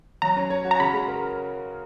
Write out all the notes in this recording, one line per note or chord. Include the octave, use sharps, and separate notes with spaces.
F#3 A#5
C#4
C#5
F#4
A#5
C#3 B5
G#3
A#4